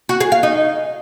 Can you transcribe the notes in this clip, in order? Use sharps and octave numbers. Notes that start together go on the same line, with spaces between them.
F#4
G#4
F5
D#4